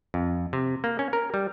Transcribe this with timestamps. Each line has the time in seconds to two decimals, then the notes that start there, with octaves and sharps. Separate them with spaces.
0.14 F2
0.53 C3
0.84 A#3
0.99 C#4
1.13 A#4
1.34 G3